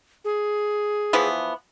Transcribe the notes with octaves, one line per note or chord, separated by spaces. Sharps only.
G#4
E3 F3 B3